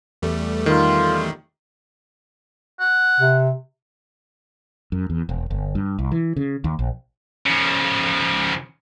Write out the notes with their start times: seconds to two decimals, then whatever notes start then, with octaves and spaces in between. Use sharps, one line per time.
0.22 E2 G3 A3
0.66 D#3 F4
2.80 F#5
3.20 C3
4.92 F#2
5.10 E2
5.29 E1
5.50 G1
5.75 G2
5.99 C2
6.12 E3
6.36 C#3
6.64 D#2
6.79 A#1
7.46 C#3 F3